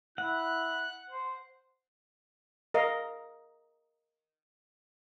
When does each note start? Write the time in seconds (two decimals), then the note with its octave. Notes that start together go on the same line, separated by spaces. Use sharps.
0.18 E4 F#5 F#6
1.10 C5
2.74 A#4 D#5 F5